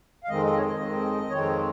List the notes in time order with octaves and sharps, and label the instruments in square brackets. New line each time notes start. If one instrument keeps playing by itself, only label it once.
[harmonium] F5
F2 D#3 G#3 C4 D#5
D#5
C#5
D#5
F2 D#3 G#3 C4
F2 D#3 G#3 C4 C#5